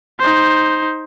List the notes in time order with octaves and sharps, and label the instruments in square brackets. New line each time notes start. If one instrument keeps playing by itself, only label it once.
[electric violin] D#4 C5